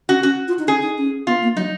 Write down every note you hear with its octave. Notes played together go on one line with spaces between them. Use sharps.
C#4 F#4
C#4 F#4
F4
D#4
C#4 G#4
D#4
C#4
B3 F4
A#3
F#3 D#4